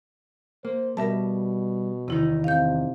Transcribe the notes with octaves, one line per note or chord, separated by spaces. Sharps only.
A#3 C5
B2 G3 A#4 E5 A5
E2 C3 D#3 D#4 E4
C3 F5 G6